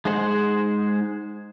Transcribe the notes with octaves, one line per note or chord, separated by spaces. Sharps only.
G#3 D#4 G#4 C5 F#5